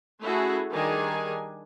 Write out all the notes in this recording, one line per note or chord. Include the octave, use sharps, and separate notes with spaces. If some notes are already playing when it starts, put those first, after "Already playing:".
A3 C#4 E4 F#4 G#4 A4
D#3 G3 D4 G#4 G#5